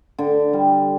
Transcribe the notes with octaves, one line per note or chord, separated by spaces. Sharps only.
D3
G3